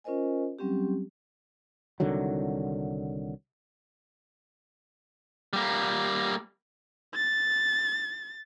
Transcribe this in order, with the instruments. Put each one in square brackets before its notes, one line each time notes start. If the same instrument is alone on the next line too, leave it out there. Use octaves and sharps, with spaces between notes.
[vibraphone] C#4 F4 A#4 C5 D#5 G#5
F#3 G3 C4 C#4 G4
[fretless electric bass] C2 D3 D#3 F#3
[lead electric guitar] G3 A#3
[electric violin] A6